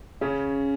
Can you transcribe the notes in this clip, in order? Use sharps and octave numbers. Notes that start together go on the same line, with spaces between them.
C#3 C#4